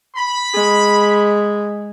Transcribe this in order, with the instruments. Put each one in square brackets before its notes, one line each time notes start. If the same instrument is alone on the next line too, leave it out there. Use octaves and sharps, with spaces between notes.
[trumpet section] B5
[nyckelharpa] G#3